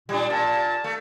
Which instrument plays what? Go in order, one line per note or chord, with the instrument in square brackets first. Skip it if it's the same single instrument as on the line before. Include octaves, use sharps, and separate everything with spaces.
[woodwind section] A#2 [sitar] G3 D4
[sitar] A#2 [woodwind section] A5
[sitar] A3